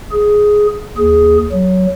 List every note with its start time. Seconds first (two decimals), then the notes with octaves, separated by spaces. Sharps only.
0.12 G#4
0.98 D#2 G#4
1.53 F#3